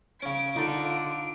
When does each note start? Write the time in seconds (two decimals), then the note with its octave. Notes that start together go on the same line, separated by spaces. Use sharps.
0.22 C#3 C#4 D7
0.56 D3 D#4 F4 A4